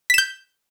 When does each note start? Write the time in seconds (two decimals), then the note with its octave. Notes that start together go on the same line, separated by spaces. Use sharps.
0.10 B6
0.14 E7
0.18 G6